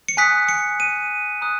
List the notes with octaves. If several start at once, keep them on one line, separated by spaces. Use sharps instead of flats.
C#7
G#5 D#6 F#6 B6
C#7
D#7
A#5 D#6 F#6